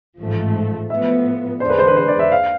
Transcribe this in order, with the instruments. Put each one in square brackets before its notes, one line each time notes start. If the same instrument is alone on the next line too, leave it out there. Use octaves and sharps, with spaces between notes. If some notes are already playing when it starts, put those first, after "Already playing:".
[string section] A1 G#2 F3 A3
[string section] A2 F3 B3 [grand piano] E5
[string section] E2 D3 G#3 D4 [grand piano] C5
[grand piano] B4
C5
B4
C5
D5
E5
F5